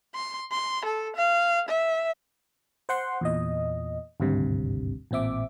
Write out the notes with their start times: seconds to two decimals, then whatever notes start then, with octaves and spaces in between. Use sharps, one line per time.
0.15 C6
0.52 C6
0.85 A4
1.16 F5
1.69 E5
2.89 C5 F#5 C6
3.21 E2 A#2 D#5
4.20 G#1 D2 G2 C3
5.11 A1 A#2 C4 E5 D6